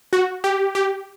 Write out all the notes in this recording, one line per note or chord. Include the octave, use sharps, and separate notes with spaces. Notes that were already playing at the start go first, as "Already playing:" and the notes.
F#4
G4
G4